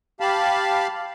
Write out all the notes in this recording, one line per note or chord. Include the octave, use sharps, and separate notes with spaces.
G4 F5 A5 B5